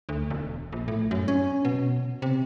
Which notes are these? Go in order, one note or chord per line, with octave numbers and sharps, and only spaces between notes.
D2
E1
A#1
A2
F#2
C#4
B2
C3